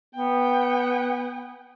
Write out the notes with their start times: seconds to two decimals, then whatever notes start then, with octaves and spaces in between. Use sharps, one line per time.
0.15 B3 G5